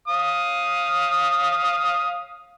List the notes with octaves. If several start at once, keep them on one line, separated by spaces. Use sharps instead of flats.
F5 D#6